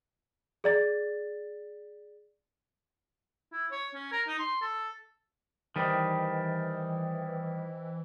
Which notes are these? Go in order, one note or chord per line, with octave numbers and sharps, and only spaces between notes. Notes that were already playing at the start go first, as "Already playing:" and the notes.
G#4 D5 A6
E4
C#5
C#4
A#4
D#4
C6
A4
D#3 E3 G3 C5 D#5 G5